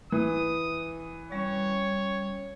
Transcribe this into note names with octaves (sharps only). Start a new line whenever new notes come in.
E3 D#6
G3 C#4 C#5